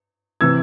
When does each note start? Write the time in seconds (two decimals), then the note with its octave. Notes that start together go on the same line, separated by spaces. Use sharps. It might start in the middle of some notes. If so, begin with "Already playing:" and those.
0.41 C3 E3 E6 G#6